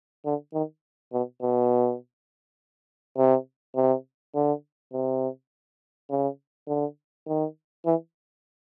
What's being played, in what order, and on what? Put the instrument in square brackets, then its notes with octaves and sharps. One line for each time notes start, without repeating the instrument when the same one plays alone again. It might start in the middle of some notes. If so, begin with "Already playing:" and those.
[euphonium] D3
D#3
B2
B2
C3
C3
D3
C3
C#3
D3
D#3
E3